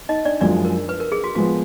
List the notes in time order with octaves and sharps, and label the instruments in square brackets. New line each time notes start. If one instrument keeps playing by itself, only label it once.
[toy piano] D#4 D#5
D4 D5
[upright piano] F#2 F3 G#3 [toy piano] D4 D5
[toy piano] A#4
B4
A#4
G#4
F#4
[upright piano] F3 G#3 B3 [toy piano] F#4